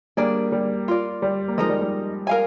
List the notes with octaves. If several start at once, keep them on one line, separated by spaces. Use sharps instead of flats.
G3 A#3 D4 G#4 D5
G3
F4 A#4 D5
G3
A#3
F3 G#3 D#4 A#4 D#5
G3
G3
A#4 F5 G#5